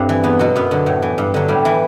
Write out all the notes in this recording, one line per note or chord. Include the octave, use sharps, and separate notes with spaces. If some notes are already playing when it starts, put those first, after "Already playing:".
Already playing: G2 A3 C4
E3
E2 B3
B2 F#3 F#4
F#2 B3
D3 F#3
A2
E3
G2
D3 F#3
A2 G3
E3